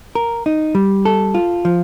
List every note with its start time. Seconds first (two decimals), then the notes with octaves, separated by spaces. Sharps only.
0.15 A#4
0.46 D#4
0.75 G3
1.05 A4
1.34 F4
1.65 F3